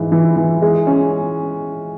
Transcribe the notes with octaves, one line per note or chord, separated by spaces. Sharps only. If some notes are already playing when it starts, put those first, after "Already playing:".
Already playing: G#2 E3
E3
E3
G#3
C#4